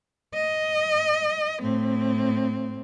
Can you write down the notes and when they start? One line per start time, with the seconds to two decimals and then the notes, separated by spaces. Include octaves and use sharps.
0.35 D#5
1.62 A2 C4